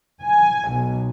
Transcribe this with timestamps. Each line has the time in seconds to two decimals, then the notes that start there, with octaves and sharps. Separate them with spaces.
0.22 G#5
0.71 B1